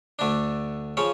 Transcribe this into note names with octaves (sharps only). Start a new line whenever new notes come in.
D2 D3 A3 D4
C#3 F3 C#4 C#5